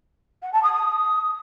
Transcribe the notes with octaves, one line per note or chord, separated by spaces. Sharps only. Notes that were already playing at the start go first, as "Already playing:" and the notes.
F#5
A5
D#6
D#6